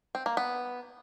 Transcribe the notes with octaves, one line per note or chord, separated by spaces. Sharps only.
C4
A#3
B3